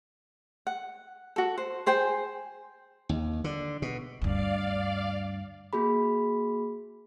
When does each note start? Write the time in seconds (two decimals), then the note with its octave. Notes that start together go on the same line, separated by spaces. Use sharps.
0.67 F#5
1.36 F#4 A4
1.58 C5
1.86 G#4 C5 G5 G#5
3.09 D#2
3.44 D3
3.82 B2
4.22 D2 G2 D5 F5
5.73 A#3 F#4 G#4 B5